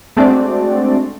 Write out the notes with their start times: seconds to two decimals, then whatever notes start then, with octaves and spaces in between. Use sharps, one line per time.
0.17 G#3 A3 C4 D4 F#4 D5